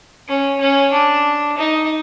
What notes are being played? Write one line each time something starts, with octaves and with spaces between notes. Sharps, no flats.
C#4
C#4
D4
D#4